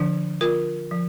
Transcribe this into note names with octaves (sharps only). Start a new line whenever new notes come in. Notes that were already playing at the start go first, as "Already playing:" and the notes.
Already playing: D3 F3 D4
F4 A#4
F3